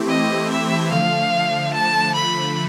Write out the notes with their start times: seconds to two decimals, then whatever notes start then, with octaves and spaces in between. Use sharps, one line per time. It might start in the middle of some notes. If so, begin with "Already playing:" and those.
Already playing: E3 A3 C4 E4 G4
0.09 D#5
0.50 E5
0.91 D3 F3 A3 F5
1.74 A5
2.15 B5